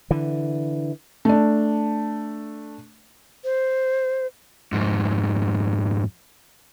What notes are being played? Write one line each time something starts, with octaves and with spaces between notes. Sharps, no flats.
D3 E3
A3 D4
C5
F2 G#2